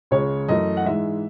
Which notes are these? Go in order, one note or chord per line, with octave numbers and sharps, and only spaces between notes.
C#2 C#3 G#3 C#5
F#2 E3 A3 D#5
F#5
G#2 E3 G#3 E5